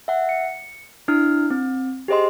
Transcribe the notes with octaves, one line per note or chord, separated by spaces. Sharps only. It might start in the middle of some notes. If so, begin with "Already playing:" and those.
E5 F#5
C#7
D4 E4 F6
C4
G4 G#4 C5 D#5 C6